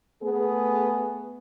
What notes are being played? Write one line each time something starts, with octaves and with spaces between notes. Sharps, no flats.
A3 B3 G#4